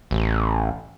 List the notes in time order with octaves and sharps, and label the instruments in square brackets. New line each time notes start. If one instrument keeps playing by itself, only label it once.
[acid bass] A1